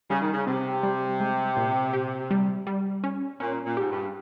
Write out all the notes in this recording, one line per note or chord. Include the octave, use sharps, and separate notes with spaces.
C#3 G3
D#3
C#3
C3 C4
G3
G#3
A#2
G4
G3
G3
C#4
A#2 C#4
A#2
G#2 G4
G2